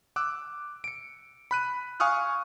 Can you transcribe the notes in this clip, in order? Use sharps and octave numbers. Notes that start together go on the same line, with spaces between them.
D6 E6 F#6
C#7 D7
B5 F#6 D#7
F5 G#5 C#6 D#6 F6 F#6